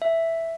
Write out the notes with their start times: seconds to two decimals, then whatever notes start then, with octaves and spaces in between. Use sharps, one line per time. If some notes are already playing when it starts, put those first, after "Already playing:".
0.02 E5